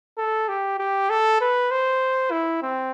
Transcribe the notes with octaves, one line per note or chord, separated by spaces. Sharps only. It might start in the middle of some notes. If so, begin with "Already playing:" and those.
A4
G4
G4
A4
B4
C5
E4
C4